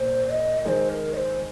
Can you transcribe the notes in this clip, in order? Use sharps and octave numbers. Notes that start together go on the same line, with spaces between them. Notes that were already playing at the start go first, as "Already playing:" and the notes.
Already playing: A#2 C5
D#5
D#3 G#3 C5 D#5
A#4
D#5
C5